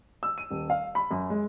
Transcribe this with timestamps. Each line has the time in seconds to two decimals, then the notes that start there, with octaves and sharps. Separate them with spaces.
0.23 E6
0.38 D#7
0.50 D#1
0.70 F5
0.95 B5
1.11 F#2
1.30 G#3